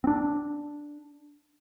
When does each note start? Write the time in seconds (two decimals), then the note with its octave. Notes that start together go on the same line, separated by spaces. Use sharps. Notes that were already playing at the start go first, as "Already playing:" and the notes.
0.04 C4 D4